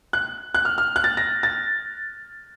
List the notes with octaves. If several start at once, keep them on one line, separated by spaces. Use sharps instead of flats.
F#6
F#6
F6
F6
F#6
A6
A#6
A6